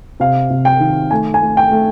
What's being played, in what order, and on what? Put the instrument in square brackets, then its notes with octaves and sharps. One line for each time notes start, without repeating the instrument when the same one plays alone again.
[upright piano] C3 F5
C3
G5
D#3
A3 G#5
G#5
A3
G5
A3